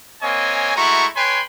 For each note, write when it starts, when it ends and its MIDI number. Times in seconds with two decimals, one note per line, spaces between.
0.22 0.73 58
0.22 0.73 60
0.22 0.73 73
0.22 0.73 75
0.22 0.73 80
0.76 1.06 56
0.76 1.06 57
0.76 1.06 64
0.76 1.06 66
0.76 1.06 82
0.76 1.06 85
1.15 1.41 71
1.15 1.41 73
1.15 1.41 79
1.15 1.41 80
1.15 1.41 83
1.15 1.41 84